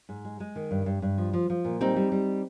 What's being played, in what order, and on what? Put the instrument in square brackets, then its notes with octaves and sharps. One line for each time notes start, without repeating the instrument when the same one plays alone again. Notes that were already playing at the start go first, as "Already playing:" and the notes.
[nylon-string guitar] G#2
G#3
G#3
D#3
G2
G2
G2
F3
F3
F3
A#2
G3 C4 D#4
G3
G3